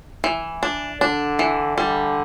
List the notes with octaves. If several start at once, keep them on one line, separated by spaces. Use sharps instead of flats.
E3
D4
D3 D4
E3
D3 G3